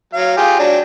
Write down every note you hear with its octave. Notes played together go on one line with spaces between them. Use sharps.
F#3 F5
F4 G4 G#4
F#3 D4